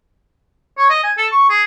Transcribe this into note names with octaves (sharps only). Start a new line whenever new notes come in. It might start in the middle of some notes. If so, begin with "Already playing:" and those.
C#5
D#5
G#5
A4
C#6
G#4